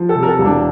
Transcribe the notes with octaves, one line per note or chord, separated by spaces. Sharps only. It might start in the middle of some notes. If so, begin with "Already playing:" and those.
Already playing: F3
A4
C3
A#4
A4
E1
D4